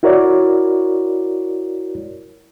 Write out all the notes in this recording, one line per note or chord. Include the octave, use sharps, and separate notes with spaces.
E4 F#4 A#4 C#5 D5